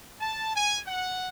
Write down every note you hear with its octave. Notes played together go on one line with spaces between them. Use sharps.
A5
G#5
F#5